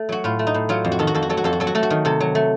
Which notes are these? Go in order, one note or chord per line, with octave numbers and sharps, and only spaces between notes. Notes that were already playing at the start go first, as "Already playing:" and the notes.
Already playing: A3
F#3 F#4
A2 F4
A3
D#4
A2
F#3 F4
F2
F#4
D#3 A4
F#4
F2 A4
F#4
F#3 A4
F#4
F2 A4
F#4
F#3 A4
F#4
A3 A4
F#4
D#3
C3 A4
F#3
A3